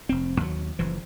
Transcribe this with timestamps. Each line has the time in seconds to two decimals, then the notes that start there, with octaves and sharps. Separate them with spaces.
0.09 F1 C4
0.40 D#2 F#3
0.79 F#1 E3 F3